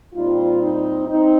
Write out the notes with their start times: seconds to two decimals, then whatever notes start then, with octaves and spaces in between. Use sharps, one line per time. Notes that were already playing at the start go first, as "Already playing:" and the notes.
0.14 A#2 G3 C4 D#4 F4
0.62 D#4
1.09 C4 D#4